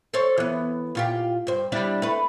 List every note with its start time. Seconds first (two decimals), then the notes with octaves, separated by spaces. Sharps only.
0.13 A4 C5 C#5
0.38 E3 B3
0.95 A#2 F4 G4
1.47 G2 C5
1.72 G3 D4 E4
2.02 A3 B4